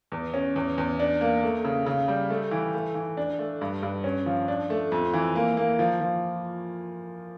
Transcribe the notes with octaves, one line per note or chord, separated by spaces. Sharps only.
E2
C#4
E2
E2
D4
A#3
A3
C#3
C#3
G3
A3
E3
A3
E3
D4
A3
G2
G2
C#4
F3
D4
A3
F2
E3
A#3
A#3
F3
F3